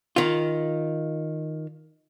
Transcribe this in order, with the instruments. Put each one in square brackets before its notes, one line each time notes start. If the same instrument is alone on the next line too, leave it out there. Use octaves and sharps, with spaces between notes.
[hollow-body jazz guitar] D#3 F4